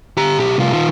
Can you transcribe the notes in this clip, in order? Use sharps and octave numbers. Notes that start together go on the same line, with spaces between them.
G4 A#5
B1 G4
C2 F4
D#3 F4